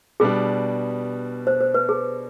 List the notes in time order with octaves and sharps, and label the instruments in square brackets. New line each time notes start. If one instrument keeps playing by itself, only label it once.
[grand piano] B2 G3 B3 D4 [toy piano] G#4
[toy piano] C5
C5
B4
G#4